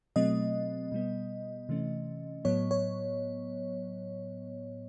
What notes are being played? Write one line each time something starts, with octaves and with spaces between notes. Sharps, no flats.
B2 F#3 A3 C4 D#5
B2 G3 B3
C3 E3 A3 C#4
A2 F#3 B3 C#5
C#5